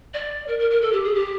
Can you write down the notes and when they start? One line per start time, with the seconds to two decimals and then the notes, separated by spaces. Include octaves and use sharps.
0.14 D5
0.48 A#4
0.59 A#4
0.70 A#4
0.81 A4
0.93 G4
1.04 G#4
1.15 G4